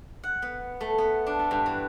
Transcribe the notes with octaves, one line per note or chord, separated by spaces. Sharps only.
F#5
B3
A3
B3
D4
A4
G2
E3